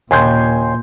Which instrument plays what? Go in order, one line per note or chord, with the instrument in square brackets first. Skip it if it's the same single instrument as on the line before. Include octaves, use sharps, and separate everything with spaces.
[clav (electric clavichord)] D#2 C#3 D4 [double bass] A#2 [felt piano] G#5 C6 G6